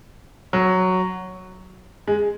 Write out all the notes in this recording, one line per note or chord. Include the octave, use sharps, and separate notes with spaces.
F#3
G#3